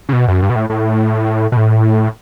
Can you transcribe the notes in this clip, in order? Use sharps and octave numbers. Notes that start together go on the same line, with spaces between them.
C#3
B2
F#2
G2
B2
A2
A2
B2
A2